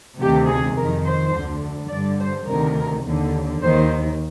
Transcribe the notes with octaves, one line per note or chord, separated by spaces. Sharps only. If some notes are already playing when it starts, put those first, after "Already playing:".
D2 C3 D#3 G4
G#4
F2 D#3 A#4
C5
D2 D3
G2 D3 D5
C5
D2 C3 D#3 A#4
D#2 D3
D#2 D#3 C5